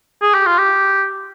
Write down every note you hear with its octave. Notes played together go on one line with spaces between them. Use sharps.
G#4
G4
F4
G4